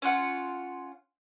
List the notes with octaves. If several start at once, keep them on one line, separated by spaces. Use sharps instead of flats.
C#4 F4 F#5